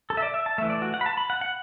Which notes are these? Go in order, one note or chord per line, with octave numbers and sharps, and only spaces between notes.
A4
E5
D5
E5
A5
E3 A3 E5
D5
F#4
F#5
B5
A5
B5
F#5
F#5